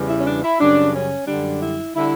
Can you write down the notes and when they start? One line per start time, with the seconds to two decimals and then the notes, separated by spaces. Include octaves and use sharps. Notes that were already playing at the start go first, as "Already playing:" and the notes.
Already playing: E2 C#3 E3 G3
0.09 E4
0.19 C#4
0.26 D4
0.43 E4
0.60 F#2 C#3 G3 D4
0.94 C#4
1.28 F#2 D3 G3 D4
1.62 E4
1.96 D3 G3 E4